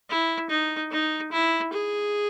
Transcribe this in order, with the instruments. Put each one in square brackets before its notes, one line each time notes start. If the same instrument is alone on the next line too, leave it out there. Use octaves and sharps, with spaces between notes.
[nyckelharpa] E4
D#4
D#4
E4
G#4